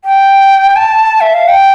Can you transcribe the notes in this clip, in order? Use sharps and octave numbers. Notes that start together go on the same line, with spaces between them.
G5
A5
E5
F5
G5